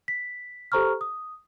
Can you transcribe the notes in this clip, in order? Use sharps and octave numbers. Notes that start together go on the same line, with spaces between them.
B6
G4 A4 C5 A#5 C#6 F6
D#6